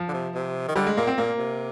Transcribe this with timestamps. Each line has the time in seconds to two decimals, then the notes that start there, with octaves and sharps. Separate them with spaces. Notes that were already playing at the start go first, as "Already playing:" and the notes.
Already playing: F3
0.08 D3
0.14 C3
0.34 C3
0.68 D#3
0.76 D3 G3
0.87 G#3
0.97 A#2 A#3
1.07 C4
1.17 A#2 A#3
1.38 C3